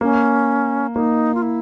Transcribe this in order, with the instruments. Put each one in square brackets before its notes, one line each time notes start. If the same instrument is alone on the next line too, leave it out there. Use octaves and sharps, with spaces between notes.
[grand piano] A#3 [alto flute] C#4
[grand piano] A#3 [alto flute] D#4
[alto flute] F4
E4